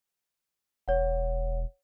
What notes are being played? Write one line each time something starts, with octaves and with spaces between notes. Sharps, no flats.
E1 C#5 F#5